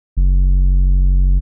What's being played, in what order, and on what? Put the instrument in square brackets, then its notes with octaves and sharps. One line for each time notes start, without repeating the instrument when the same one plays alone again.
[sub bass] F#1